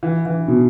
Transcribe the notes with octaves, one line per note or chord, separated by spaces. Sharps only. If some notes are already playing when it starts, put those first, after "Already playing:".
E3
E3
B2